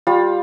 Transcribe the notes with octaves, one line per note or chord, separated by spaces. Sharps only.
G3 F4